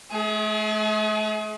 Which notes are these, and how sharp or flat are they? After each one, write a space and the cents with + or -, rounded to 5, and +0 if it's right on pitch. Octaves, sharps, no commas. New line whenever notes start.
A3 -40 G#4 +25